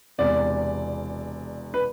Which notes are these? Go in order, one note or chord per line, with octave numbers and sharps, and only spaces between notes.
E1 E2 C3 D5
B4